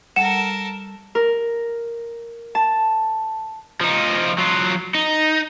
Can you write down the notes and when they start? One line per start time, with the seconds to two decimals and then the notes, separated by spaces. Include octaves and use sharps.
0.16 G3 A4 A#4 F#5 E7
1.15 A#4
2.55 A5
3.81 F3 D#4
4.38 F#3 F4
4.95 D#4